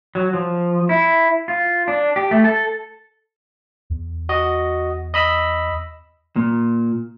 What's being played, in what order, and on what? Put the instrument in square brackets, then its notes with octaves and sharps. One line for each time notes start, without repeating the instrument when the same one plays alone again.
[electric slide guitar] F#3
F3
E4
F4
D4
G4
A3
A4
[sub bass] E2
[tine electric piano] F#4 D#5
D#5 B5 E6
[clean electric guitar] A#2